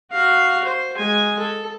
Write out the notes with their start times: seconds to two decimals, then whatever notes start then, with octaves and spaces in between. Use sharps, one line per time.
0.12 F#4 F5
0.65 C5
0.97 G#3 G#5
1.40 A4